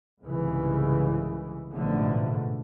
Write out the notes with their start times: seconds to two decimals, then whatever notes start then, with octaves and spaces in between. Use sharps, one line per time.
0.21 C2 G#2 C#3 E3
1.74 A1 G#2 B2 D3 F3 A3